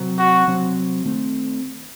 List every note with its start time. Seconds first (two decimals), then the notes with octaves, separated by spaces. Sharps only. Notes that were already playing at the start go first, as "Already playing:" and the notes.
Already playing: C3 F#3 C4
0.18 F#4
0.47 C3 F#3 C4
1.05 D#3 A3 C4